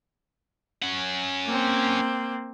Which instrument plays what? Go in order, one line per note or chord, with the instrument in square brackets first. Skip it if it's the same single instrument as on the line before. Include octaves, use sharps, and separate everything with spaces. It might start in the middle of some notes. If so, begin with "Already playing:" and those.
[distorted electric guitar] C#4 F#5
[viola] A#3 C4